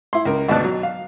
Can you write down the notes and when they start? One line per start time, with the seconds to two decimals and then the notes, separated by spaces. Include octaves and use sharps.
0.13 E4 C6
0.25 C#2 A#4
0.48 G#1 D2 B2 D5 A5 F#6
0.64 F#3
0.83 F5